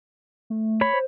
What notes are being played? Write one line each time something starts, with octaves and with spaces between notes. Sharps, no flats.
A3
C#5 B5
C5